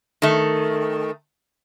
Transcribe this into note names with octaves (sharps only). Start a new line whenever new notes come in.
D#3 A3